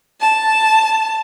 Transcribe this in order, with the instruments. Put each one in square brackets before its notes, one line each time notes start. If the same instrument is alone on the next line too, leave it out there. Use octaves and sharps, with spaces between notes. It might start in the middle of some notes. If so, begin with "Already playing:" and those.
[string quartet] A5